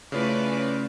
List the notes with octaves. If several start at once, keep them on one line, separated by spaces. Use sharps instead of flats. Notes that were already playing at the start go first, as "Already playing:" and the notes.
C#3 A3 C#4 E4 F4 B4 D5